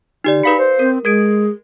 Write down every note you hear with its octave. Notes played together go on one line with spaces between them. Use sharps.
D3 D#4 G4 D5
D#4 G#4 B4 F5 B5 C#7
C5
C4 A#4
G#3 G#4 A#4 G#6 D7